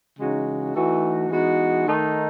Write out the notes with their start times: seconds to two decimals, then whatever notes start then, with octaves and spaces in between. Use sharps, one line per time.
0.18 C#3 E3 G#3 D#4 F#4
0.73 E3 A3 D#4 F#4
1.29 E3 G#3 B3 D#4 F#4
1.86 D#3 A3 D#4